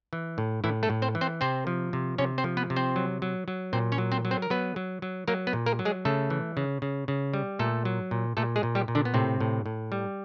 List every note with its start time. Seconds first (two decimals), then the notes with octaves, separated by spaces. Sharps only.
0.13 E3
0.38 A2
0.64 A2 E3 E4
0.83 A3 A4
0.90 A2
1.02 C4 C5
1.15 E3
1.21 C4 C5
1.41 C3 C4 C5
1.67 F3
1.93 C3
2.18 C3 C#4 C#5
2.38 C4 C5
2.44 F3
2.57 B3 B4
2.70 C3
2.76 C4 C5
2.96 F#3
3.22 F#3
3.48 F#3
3.73 A#2 C4 C5
3.92 C#4 C#5
3.98 F#3
4.12 C4 C5
4.25 F#3
4.31 C4 C5
4.42 A#4
4.50 F#3 B3 B4
4.76 F#3
5.02 F#3
5.28 F#3 A#3 A#4
5.47 B3 B4
5.53 A#2
5.66 A#3 A#4
5.79 F#3
5.85 G#3 G#4
6.05 C#3 A3 A4
6.30 E3
6.57 C#3
6.82 C#3
7.08 C#3
7.34 G3
7.59 A#2 A3 A4
7.85 F#3
8.11 A#2
8.37 A#2 A3 A4
8.56 G#3 G#4
8.63 A#2
8.75 G3 G4
8.88 A#2
8.95 D3 D4
9.05 B3
9.14 A2 C3 C4
9.40 A2
9.66 A2
9.92 G3